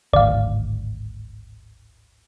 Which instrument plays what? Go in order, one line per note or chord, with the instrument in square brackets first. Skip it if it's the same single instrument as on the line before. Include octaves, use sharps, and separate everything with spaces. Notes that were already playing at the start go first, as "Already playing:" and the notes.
[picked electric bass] D1 G#1 D2 [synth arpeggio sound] D5 F5